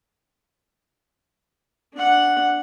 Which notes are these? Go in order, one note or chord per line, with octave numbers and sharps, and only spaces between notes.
D4 F#5